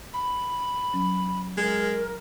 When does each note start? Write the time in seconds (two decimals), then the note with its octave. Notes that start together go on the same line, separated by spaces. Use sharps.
0.14 B5
0.93 F#3 C#4
1.57 G#3 A#4